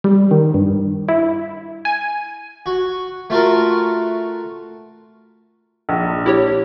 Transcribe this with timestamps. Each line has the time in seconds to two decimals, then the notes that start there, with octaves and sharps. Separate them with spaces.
0.04 G3
0.31 D#3
0.54 G2
1.09 E4
1.85 G#5
2.66 F#4
3.30 A3 F4 F#4 A4 A#4
5.89 A#1
6.26 E4 G4 C#5